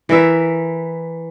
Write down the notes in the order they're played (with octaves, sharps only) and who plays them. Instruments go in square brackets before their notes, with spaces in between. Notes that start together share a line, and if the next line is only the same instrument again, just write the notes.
[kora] E3 A#4 E5